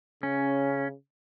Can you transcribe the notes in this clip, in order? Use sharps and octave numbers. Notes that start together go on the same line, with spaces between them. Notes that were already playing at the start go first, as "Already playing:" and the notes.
C#3 C#4